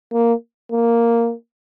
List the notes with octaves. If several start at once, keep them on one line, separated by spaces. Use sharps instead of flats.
A#3
A#3